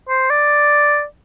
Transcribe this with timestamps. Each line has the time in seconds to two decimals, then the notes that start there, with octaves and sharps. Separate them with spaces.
0.09 C5
0.30 D5